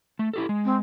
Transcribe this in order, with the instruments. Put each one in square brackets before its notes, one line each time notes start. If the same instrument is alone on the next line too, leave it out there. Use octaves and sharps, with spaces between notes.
[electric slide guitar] A3
E4 G4 A4
G#3
[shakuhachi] C4